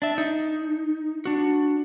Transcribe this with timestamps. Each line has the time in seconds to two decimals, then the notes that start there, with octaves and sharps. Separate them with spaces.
0.02 D4 E5
0.18 D#4
1.25 D4 F#4